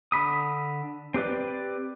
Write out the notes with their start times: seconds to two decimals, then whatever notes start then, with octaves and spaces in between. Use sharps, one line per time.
0.12 D3 B5 D#6
1.14 C4 G4 B4 D5